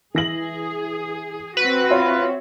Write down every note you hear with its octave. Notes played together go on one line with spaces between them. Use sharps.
E3 G#4 A#6 F#7
C4 F#4 B4
F4 C#5 E5